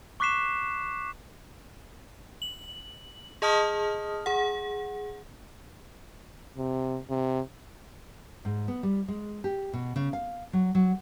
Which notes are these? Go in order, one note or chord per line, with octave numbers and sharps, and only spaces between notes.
C#6 D6 F#6 B6 C7 E7
F#7
G#4 D#5 A5 D#6 F6
G#4 F#5
C3
C3
G#2
B3
G3
G#3
G4
B2
C#3
F5
F#3
F#3